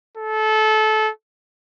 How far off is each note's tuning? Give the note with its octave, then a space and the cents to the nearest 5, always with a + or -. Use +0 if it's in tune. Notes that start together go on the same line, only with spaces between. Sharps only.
A4 -25